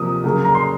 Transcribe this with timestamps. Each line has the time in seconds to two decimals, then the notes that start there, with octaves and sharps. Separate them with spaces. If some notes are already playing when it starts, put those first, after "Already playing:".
Already playing: C3 F3 A#3 D#6
0.24 C#3 F#3 A#3
0.45 A#5
0.55 C6